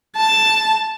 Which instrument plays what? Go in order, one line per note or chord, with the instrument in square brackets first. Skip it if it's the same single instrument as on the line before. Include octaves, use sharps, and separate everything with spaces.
[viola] A5